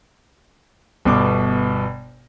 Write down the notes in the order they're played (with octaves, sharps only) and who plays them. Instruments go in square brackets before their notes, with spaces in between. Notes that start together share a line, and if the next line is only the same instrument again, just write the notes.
[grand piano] G1 B2 D6